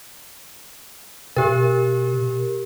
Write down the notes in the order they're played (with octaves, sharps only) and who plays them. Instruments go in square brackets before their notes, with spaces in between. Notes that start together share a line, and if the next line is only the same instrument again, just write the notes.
[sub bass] B2 [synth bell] G4 A#4